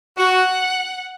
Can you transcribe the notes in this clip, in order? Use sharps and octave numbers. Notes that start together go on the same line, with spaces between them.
F#4 F#5